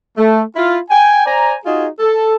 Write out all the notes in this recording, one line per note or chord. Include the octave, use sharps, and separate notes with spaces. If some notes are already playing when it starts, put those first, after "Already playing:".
A3
E4 F4
G5 G#5
C5 D5 G#5 A#5
D#4 F4 F#4 G#4
A4